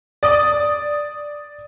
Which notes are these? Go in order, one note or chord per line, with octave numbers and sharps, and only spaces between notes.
D5 D#6